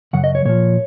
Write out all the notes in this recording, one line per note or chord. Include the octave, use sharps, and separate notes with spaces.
F#2 C#3 F#3 F#5
D#5
C#5
A#2 F3 C#5